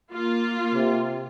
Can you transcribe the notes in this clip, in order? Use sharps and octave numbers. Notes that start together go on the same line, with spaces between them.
A#3 F4
C3